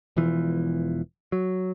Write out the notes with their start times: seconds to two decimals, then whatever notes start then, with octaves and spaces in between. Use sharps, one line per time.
0.17 E1 E2 E3 F3
1.32 F#3